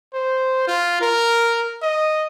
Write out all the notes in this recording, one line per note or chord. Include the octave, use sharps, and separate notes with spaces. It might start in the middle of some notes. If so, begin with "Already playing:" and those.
C5
F4
A#4
D#5